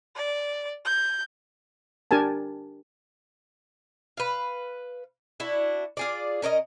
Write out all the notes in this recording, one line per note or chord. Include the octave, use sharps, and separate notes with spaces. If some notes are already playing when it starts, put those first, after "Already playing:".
D5
G6
D4 G4 A#4 G#5 A5
B4 F5
D4 E4 F#4
F4 G#4 D5
C#4 A#4 D5 D#5